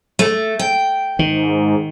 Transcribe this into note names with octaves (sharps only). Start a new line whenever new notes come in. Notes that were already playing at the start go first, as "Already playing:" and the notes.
A3
G5
G#2 D#3